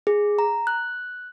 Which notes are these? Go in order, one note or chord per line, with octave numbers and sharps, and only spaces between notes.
G#4
A#5
F#6